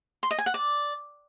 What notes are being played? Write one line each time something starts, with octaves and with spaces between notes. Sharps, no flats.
C6
D#5
G#5
F#5
D5